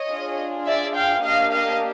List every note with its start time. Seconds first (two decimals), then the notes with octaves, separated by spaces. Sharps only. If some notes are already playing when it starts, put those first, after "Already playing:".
Already playing: C#5 D#5
0.09 D4 F4 G#4
0.66 D5 E5
0.95 F5 G5
1.24 A#3 D4 G4 D#5 F5
1.52 D#5 F5